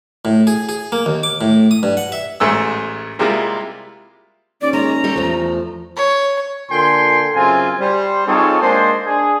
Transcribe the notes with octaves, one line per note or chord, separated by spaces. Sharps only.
A2
G#4
G#4
A#3
D#2
D6
A2
D#6
G2
F#5
E5
A1 G#2 A3 E6
C3 G3 G#3 A#3 E4 F4
D#2 C#4 D5
D#2 G#3 A#5
G3 A3 A4
E2 F3 A3
C#5
A#2 D3 G5 G#5 C6
F#2 C#3 C4 F4 G#5
G3 C5
C4 D#4 F4 G#4 A4 C#5
G#3 A#3 D4 G#4 C5
D4 G#4